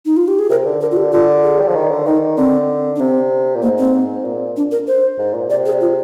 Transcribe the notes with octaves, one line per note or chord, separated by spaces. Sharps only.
D#4
F4
G4
G#4
C3 A#4
D3
D3 A#4
F4
G4
D3 F4
G#4
G3
F3
D#3
D3
D#3 D#4
D3 C4
D4
C3 C4
A#2
G#2 A#3
C4
G#2
A#2
D4
A#4
C5
G#2
A#2
C3 D5
G#4
F4